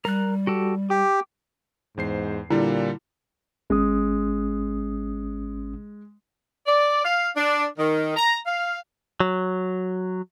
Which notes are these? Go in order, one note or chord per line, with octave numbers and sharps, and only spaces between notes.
G3 A#4 F#6
F#4 G4 A4
G4 D6
E2 G#2 C5 C7
A#2 D3 G3 E4
G#1 G#3 C#4 D#6
D5
F5
D4
D#3
A#5
F5
F#3